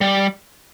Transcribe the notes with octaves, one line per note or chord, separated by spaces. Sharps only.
G3